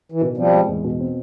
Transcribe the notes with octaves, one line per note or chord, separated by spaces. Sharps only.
E3
B2 D#3
F3 G3 C4
G#3
E2
B2
C4